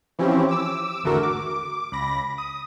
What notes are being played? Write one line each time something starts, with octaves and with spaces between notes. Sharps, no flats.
E3 F3 C4 C#4 E4 G4
D6 E6
G#1 E2 D3 A3 F#4 A#4
D6
C#2 B5 A#6
D#6